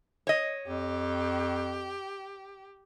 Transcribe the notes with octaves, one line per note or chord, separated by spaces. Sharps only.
C#5 D#5
F2 G4